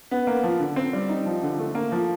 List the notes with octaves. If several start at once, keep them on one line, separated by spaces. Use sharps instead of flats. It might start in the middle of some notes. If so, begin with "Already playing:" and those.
B3
A#3
F3
D3
C4
G3
D#4
F3
D3
A3
A#3
F3